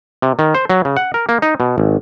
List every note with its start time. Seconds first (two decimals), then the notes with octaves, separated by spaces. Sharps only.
0.22 C3
0.39 D#3
0.55 C5
0.70 F#3
0.85 C#3
0.97 F#5
1.14 A#4
1.29 A#3
1.42 D#4
1.60 B2
1.78 G#1